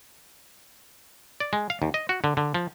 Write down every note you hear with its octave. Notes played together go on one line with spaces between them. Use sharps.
D5
G#3
F5
D#2
D#5
F#4
D3
D3
F3